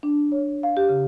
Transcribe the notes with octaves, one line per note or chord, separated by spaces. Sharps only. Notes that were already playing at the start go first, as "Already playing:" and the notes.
D4
C#5
F5
G4
C#3